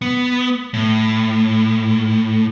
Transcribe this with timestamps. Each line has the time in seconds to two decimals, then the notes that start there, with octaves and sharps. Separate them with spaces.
0.02 B3
0.74 A2